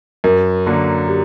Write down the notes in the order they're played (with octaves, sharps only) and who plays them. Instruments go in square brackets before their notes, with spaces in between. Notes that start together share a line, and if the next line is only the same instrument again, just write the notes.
[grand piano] F#2 [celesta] A#4
[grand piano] D3 F#3 A#3
[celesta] G4